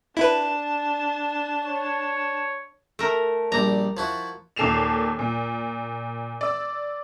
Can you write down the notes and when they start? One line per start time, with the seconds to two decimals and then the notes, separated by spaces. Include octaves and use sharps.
0.17 D4 E4 B4 A5
1.63 C#5
2.99 A3 A#4
3.52 A#1 G3 A#5
3.97 F3 E4 F#4
4.56 D#2 A#2 A4 C7 E7 F7
5.19 A#2
6.41 D5 E6